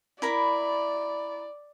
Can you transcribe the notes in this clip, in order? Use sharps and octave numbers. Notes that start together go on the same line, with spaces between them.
E4 A#4 D5 B5